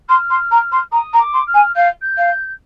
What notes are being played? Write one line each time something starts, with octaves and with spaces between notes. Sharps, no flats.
C6 F6
C6
A#5
C6
A#5 D#6
A#5
D6
C6
F6
G#5
F5 G6
G6
F5